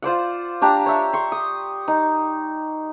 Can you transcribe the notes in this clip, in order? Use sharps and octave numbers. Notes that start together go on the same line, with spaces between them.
F4 C5 D5 F#5
D4 G4 A#5
C#5 E5
C6 C#6
D#6
D#4